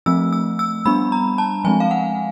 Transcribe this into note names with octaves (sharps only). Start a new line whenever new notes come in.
F3 A3 C4 E6
E6
E6
G3 B3 D4 B5
A#5
A5
F3 G#3 C4 G#5
F5
F#5